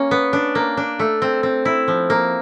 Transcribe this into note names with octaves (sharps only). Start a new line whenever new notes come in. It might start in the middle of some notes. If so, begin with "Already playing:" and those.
Already playing: A#3 C#4
B3
D4
A#3
D4
A3
C4
C4
E4
F3
A#3